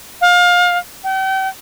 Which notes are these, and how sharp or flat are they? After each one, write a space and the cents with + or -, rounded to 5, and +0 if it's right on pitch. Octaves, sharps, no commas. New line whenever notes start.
F5 +30
G5 -40